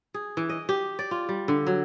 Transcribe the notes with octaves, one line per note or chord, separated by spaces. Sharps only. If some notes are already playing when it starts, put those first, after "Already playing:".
G#4
E3
D#5
G4
D5
F4
G3
D3
F#3